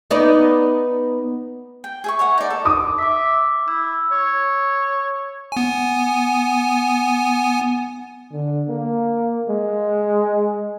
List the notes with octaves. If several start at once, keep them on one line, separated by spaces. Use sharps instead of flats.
B3 D#4 D5
G5
G#4 E5 C#6
C#5 E5 F#5
D#4 D5
A4
D6 D#6
E5 D6 B6
E4 E6
C#5
B3 G#5
D3
A#3
G#3